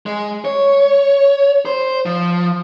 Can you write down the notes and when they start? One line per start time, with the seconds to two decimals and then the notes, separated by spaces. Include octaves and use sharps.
0.06 G#3
0.45 C#5
1.65 C5
2.06 F3